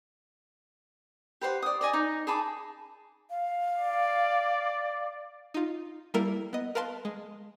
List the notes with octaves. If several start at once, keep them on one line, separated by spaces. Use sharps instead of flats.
G4 B4 C5 F#5
D5 D#6
D5 D#5 G#5
D#4
G#4 A5 B5 D6
F5
D5
D#4 F4
G3 A#3 E4 A4 A#4 E5
B3 D#5
A#4 B4 F5 A5 C6
G#3